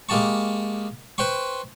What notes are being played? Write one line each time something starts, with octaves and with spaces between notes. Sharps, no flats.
G#3 A#3 G4 A5 C#6
B4 C5 G5 C6 C#6